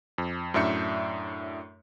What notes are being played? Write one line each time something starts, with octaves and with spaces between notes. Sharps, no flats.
F2
F#2 A2 D4 E5 G6 C#7